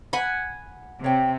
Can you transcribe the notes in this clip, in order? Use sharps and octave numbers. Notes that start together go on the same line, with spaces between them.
F#5 G#5 B5
C3 C#5 G5